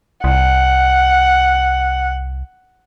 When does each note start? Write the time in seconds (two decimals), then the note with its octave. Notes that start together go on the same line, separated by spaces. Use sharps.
0.24 C2 F#5